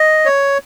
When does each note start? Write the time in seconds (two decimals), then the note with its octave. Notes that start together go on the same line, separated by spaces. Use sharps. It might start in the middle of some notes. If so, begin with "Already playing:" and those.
Already playing: D#5
0.25 C#5